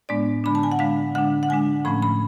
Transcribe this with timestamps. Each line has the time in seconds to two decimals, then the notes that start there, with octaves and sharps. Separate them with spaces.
0.09 A2 G#3 B3 D4 D5
0.44 D3 G#3 D4 B5
0.55 A5
0.63 G#5
0.72 F#5
0.79 D3 G#3 D4 F5
1.15 D3 G#3 D4 F#5
1.43 F#5
1.49 D3 G#3 D4 G#5
1.85 A2 F3 A3 C#4 B5
2.02 B5